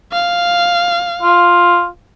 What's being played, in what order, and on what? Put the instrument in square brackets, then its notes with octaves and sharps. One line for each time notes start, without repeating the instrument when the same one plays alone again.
[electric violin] F5
[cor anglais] F4